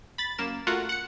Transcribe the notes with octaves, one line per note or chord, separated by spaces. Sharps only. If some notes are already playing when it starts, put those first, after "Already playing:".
B5 A6
F#2 A#3 E7
A3 F4 F#4 A#4 F#5
F#5 C#7